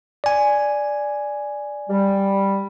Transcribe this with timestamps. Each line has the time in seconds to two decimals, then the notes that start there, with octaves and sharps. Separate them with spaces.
0.24 D5 G#5
1.90 G3